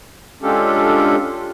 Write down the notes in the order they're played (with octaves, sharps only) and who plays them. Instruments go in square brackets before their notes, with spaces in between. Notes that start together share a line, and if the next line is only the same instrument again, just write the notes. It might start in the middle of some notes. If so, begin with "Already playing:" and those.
[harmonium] G#3 C#4 D4 F4 G4 A4